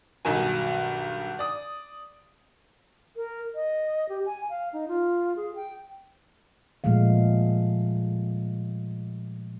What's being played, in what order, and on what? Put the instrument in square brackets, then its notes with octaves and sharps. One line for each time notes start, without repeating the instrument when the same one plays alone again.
[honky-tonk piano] B1 G2 D#3 F#3 A#4 G#5
D5 D#6
[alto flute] A#4
D#5
G4
G#5
F5
D#4
F4
G#4
G5
[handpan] A#2 F3 G#3 A3 F5